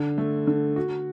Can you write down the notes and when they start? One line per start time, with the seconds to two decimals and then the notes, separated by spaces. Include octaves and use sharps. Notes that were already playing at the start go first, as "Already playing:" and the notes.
Already playing: D3
0.18 A3
0.47 D3
0.76 F#4